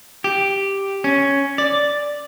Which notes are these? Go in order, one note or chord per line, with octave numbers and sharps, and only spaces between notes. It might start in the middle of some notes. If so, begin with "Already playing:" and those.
G4
C#4
D5